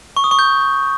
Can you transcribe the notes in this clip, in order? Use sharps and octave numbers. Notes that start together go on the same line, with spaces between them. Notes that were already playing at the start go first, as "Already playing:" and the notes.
C#6
D#6
C#6
G6